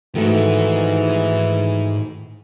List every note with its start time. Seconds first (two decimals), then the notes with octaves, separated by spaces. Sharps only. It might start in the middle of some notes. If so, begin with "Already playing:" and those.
0.15 G#2 D#3 E3 A3 F#4